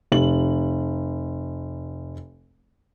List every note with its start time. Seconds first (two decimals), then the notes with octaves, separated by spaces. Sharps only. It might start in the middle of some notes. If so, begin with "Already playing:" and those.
0.12 F1 F#7